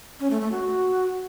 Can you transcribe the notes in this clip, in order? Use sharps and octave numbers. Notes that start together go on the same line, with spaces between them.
C#4
A3
A3
F#4